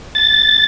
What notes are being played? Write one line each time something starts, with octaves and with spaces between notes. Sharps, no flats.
A6